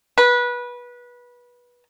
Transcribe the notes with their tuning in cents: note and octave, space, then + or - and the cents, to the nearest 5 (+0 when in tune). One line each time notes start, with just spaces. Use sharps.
B4 -20